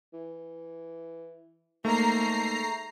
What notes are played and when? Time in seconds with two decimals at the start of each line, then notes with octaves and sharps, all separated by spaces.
0.13 E3
1.85 G#2 A3 A#3 A#5 C7